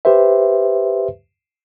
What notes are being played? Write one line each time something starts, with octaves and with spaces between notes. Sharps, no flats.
G4 B4 C5 E5